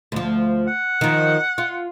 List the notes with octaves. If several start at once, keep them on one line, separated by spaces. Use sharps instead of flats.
D2 F3
F#5
D#3 F3
F4